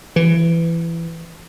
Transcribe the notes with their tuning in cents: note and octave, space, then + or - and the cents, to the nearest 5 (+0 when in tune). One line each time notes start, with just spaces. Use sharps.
E3 +20